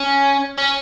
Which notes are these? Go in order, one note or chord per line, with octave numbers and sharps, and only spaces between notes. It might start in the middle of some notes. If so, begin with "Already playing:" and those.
Already playing: C#4
C#4